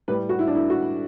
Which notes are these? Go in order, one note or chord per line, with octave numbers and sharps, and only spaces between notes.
A2 G3 B4
F#4
E4
D4
E4
F#4